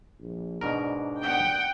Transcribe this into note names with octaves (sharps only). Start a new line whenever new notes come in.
A#1
G#2 B2 D4 A#4
B3 F#5 G5